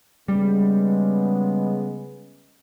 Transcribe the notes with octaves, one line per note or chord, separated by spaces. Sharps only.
C#3 G3 G#3 B3